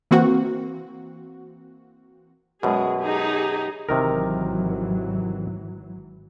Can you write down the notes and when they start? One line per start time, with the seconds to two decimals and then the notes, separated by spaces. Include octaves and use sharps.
0.11 E3 A#3 C4 F#4
2.63 F#2 B2 G#3 G#4
3.01 D#4 G4 G#4
3.89 G#1 C3 D#3 E3 F#3 A#4